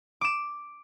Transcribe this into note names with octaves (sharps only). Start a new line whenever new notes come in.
D6 E7